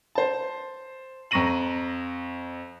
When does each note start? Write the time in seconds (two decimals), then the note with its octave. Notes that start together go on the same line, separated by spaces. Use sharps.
0.15 C5 A5
1.31 F2 A#5 C#6 A#6 D#7 F#7